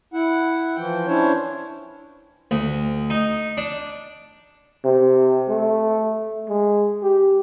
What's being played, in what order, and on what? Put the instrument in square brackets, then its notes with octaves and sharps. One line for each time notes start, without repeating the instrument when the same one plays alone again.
[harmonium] E4 F#5
E3 F3 G5
C#4 D4 E4 C5 C#5
[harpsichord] D2
D#4
D4
[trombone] C3
A3
G#3
G4